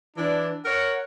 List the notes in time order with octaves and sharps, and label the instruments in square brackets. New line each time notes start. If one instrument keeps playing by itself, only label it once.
[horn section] E3 D4
A#4 C#5 F#5